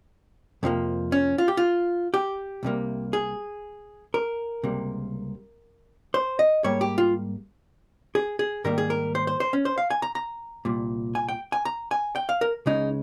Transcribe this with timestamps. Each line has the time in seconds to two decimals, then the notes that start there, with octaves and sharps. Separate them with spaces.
0.63 F2 C3 F3 A#3
1.12 C#4
1.38 F4
1.48 G4
1.57 F4
2.14 G4
2.63 C2 C3 G3 A#3
3.13 G#4
4.14 A#4
4.63 C#2 C3 G3 A#3
6.14 C5
6.39 D#5
6.64 G#2 G3 A#3 C#5
6.81 G4
6.98 F4
8.15 G#4
8.39 G#4
8.64 G#2 D#3 G3 A#3 A#4
8.78 G#4
8.90 A#4
9.15 C5
9.27 C5
9.40 C5
9.53 C#4
9.65 C5
9.78 F5
9.90 G#5
10.02 A#5
10.15 A#5
10.65 C2 A#2 G3
11.15 G#5
11.29 G5
11.52 G#5
11.65 A#5
11.91 G#5
12.16 G5
12.29 F5
12.41 A#4
12.66 C#2 C#3 G#3 D#4